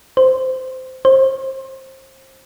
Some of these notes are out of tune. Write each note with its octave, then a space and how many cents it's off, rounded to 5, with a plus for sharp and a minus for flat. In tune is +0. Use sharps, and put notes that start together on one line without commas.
C5 -15
C5 +25